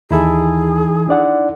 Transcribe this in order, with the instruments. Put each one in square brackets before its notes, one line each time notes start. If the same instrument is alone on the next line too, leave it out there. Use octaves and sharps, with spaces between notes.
[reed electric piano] D#2 [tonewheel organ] E3 [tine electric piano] D#4 E4 A4 [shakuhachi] G#4
[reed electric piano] D4 D5 F#5